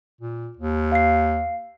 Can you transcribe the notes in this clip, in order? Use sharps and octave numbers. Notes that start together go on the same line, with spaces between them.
A#2
D#2
F5 C7